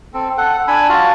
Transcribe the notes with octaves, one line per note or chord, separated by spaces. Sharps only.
C4 A4
A4 F#5
D4 G#5 B5 E6
F4 F#4 F5 A5